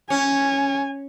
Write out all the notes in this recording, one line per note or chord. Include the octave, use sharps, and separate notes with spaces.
C#4 G#5